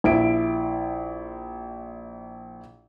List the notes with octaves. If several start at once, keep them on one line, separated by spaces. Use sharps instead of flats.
A#1 E4 D7